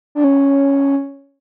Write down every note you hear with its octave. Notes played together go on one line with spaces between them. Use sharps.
D4
C#4